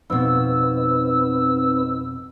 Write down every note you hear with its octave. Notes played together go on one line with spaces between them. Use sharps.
F2 B2 C4 D#4 B4 E6